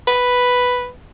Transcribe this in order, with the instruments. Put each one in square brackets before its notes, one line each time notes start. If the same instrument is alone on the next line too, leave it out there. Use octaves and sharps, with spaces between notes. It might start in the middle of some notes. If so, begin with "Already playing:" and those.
[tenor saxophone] B4